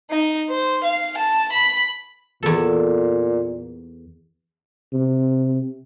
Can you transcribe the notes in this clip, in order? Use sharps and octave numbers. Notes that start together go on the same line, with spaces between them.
D#4
C5
F5
A5
B5
E2 A#2 A4
C3